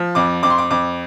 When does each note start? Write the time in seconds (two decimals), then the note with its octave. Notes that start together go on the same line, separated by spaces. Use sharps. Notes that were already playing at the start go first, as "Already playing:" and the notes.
Already playing: F3
0.15 F2 D6
0.43 F2 D6
0.50 C6
0.58 D6
0.71 F2 D6